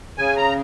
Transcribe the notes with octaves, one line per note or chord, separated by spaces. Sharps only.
C#3 G#5
A#5